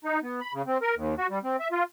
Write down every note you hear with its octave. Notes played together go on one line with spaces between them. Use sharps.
D#4
B3
B5
C#3
C4
A#4
D#2
F#4
G3
C4
E5
F4